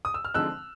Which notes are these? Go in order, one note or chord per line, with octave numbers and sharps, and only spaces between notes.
D#6
E6
F6
D3 F3 G#3 C4 D#4 E6 F#6